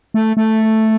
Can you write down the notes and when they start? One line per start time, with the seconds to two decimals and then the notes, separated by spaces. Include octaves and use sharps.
0.14 A3
0.37 A3